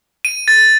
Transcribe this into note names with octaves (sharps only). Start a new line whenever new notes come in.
D#7
A6